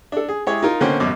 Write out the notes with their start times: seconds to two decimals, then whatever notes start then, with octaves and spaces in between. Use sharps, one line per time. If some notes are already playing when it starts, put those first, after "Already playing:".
0.12 D4 A4
0.29 G#4
0.47 G#3 E4 G4 G#4 C#5
0.63 D#4 F4 A#4
0.80 B2 D3 A#3 C#4 C5 G5
1.00 A1 F#2 B2 D6